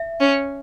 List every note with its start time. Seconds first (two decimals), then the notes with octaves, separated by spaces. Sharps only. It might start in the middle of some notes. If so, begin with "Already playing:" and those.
Already playing: E5
0.20 C#4